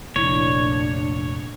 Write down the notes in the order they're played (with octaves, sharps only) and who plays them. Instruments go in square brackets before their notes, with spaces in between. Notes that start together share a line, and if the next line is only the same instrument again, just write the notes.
[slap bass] F1 [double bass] A#1 D4 [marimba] F3 E4 [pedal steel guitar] C#5